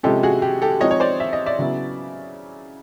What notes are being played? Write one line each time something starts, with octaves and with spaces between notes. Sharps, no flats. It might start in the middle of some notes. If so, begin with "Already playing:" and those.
C3 F3 G#3 C#4 G4 A4
F#4 G#4
G4
G4 A4
F3 G#3 C4 D#4 C#5 D#5
C#5
C5 D5
E5
D#5
D5 E5
C#3 F#3 B3 E4